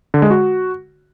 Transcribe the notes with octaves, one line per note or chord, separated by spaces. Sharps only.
D3
G#3
F#4